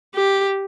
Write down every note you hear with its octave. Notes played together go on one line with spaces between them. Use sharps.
G4